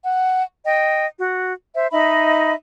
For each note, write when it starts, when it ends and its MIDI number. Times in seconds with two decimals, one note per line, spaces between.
0.03 0.42 78
0.65 1.05 75
0.65 1.05 79
1.18 1.53 66
1.75 1.86 72
1.75 1.86 76
1.91 2.54 63
1.91 2.54 75
1.91 2.54 76
1.91 2.54 83